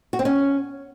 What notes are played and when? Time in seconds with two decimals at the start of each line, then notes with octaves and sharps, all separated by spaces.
0.13 F#4
0.19 C4
0.25 C#4